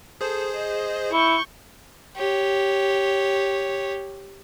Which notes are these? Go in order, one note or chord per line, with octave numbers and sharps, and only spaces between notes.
G#4 A4 C5
D#5
E4 C#6 G6
G4 C#5